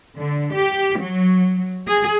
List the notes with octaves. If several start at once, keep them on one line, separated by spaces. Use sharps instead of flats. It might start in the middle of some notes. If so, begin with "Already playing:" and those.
D3
G4
F#3
G#4